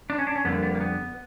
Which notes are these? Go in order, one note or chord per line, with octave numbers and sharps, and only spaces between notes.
D4
C#4
D4
C#4
F2 D3 G3 A#3 B3
B3
A#3
B3